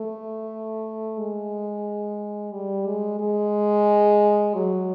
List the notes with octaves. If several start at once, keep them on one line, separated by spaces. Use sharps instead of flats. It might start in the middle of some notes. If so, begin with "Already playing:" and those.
Already playing: A3
G#3
G3
G#3
G#3
F#3